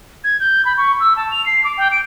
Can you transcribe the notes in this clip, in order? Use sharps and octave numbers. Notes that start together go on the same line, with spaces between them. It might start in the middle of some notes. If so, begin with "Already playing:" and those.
G#6
G6
B5
C#6
E6
A5
F7
C7
D6
G5
D7